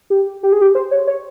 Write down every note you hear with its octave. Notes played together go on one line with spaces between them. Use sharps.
G4
G4
G#4
G4
C5
C#5
C#5